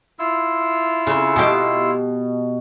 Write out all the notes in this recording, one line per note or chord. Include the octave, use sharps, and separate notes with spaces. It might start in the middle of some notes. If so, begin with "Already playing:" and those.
E4 F4 E6
C#3
B2 G4